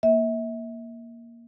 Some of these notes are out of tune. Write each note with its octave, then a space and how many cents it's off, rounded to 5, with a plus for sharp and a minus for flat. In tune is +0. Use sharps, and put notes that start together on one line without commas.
A#3 +5 E5 -35